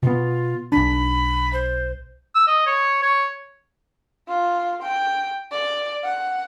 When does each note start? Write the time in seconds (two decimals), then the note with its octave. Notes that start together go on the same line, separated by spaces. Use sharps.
0.03 B2 B3 F4
0.72 B1 D4 B5
1.53 C5
2.35 E6
2.47 D#5
2.67 C#5
3.03 C#5
4.28 F4
4.83 G5
5.52 D5
6.03 F#5